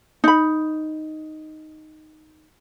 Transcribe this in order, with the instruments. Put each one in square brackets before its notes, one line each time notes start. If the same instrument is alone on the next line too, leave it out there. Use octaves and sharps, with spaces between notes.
[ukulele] D#4 B5